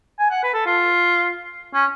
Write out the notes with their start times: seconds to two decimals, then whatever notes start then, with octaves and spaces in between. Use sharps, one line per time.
0.20 G#5
0.31 F#5
0.43 B4
0.54 A4
0.66 F4
1.74 C#4